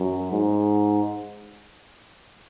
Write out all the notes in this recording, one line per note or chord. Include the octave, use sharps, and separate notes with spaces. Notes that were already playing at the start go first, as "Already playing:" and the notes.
Already playing: F#2
G#2